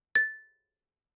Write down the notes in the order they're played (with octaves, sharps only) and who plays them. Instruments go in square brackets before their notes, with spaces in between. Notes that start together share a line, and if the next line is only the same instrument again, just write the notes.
[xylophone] A6